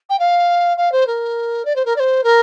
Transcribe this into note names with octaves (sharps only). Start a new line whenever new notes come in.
G5
F5
F5
C5
A#4
D5
C5
A#4
D5
C5
A#4